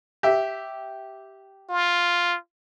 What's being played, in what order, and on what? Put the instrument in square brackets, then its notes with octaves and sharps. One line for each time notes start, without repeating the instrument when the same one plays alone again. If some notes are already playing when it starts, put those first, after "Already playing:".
[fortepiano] G4 E5
[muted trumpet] F4